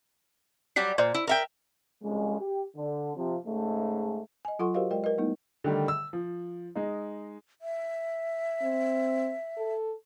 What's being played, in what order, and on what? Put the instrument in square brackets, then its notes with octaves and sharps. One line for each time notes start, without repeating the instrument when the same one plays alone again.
[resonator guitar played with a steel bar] F#3 G3 G4 [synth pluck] B6
[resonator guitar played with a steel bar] A#2 [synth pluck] C5 D5
[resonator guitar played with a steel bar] E4
A#4 E5 G5
[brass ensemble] C2 F2 C#3 G#3
G4
D3
C3 F3
G#2 C#3 G#3 A3
[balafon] D#5 G#5
F#3 F4 A4 F#5 C6 C#6
F#4 G4 A#4 C5 D#5 F5
G#3 A#4 D5 D#5 G5
A#4 B4 D#5
G3 A3 B3 D#4 E4
[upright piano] D3 D#3 G3 A3
E6
F3
G#3 D#4
[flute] E5
[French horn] C4
A4